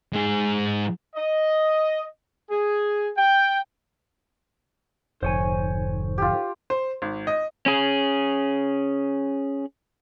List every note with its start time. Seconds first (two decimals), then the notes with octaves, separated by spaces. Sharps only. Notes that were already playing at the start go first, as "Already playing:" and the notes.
0.13 G#2 G#4
1.15 D#5
2.50 G#4
3.17 G5
5.23 F1 G#2 D3 F3 C5 C#5 G#5
6.18 F4 G4
6.70 C5
7.02 G#1
7.27 D#5
7.66 C#4 G#4